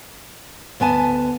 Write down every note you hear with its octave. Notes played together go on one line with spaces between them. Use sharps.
D2 B3 G#5 A5